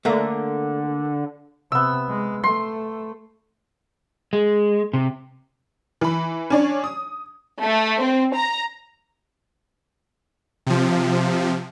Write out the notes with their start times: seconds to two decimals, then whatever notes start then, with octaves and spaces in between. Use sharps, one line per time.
0.05 D3 A3 A#3
1.72 C3 B3 E6
2.09 G#3
2.44 A3 C6
4.33 G#3
4.93 C3
6.01 E3 B5
6.50 C#4 D4 C#5
6.84 D#6
7.62 A3
8.02 C4
8.35 A#5
10.67 C3 F3